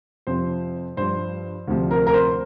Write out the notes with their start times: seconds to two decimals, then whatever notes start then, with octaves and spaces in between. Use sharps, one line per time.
0.27 F2 C3 F3 C5
0.97 G2 F3 C5
1.67 D2 C3 F3
1.91 A#4
2.07 A#4
2.14 C5